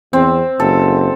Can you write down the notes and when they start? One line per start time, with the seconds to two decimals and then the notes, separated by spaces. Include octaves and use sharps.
0.13 E2 C4
0.60 F#1 A4